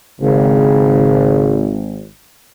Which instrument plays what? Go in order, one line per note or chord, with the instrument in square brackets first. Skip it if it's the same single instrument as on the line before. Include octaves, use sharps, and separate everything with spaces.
[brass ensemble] G#1 [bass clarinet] C#3